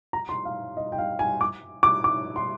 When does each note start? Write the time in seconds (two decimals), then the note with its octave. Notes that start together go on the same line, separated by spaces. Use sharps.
0.13 A#5
0.29 C6
0.45 F5
0.77 D#5
0.92 G5
0.98 F5
1.19 G#5
1.41 D6
1.83 D6
2.04 D6
2.36 C6